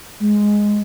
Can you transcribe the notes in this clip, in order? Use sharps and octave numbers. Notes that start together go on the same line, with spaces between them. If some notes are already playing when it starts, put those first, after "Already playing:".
G#3